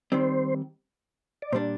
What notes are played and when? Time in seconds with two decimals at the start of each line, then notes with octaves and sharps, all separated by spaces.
0.12 D#3 G3 C4 C5
1.42 D5
1.53 A#2 G3 D4 C5